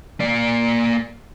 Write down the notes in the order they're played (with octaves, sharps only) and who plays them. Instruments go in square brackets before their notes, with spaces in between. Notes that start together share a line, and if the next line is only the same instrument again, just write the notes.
[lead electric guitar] A#3 D5